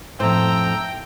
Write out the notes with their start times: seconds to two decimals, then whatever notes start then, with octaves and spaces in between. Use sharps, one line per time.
0.20 F2 A2 C5 G5 A#5 E6